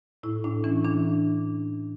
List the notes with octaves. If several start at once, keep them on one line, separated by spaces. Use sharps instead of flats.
A2 E4
A2 D4
E3 C#4
E3 D4